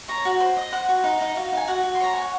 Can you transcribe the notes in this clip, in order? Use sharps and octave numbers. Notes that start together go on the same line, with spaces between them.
C#5 A#5
F#4
C5
D#5
C5 F#5
F#4
D#4
D#4 D#5
F#4 F5
D#4
G#5
F#4 F#5
F#4
C6
C#5 A#5
C#5 G#5
F#5